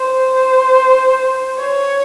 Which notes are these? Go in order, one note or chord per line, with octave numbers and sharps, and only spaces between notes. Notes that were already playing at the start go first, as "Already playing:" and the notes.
Already playing: C5
C#5